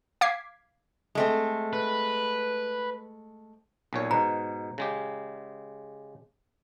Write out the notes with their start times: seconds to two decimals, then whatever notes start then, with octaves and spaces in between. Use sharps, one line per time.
0.21 F5 D6 G#6 B6 C7
1.15 G#3 A3 C4
1.73 B4
3.93 B1 A#2 C#5
4.11 G#2 B2 A#5
4.78 C#3 G#3 G4